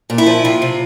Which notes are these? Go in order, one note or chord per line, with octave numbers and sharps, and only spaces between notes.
A#2
E4
F3
C3 F4
C3